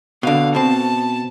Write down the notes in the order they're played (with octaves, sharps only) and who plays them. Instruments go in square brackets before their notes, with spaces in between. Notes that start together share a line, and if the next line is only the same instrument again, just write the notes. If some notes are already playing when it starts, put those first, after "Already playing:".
[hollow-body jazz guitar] B2 D3 [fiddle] F5
[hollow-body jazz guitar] B2 C4 [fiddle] A5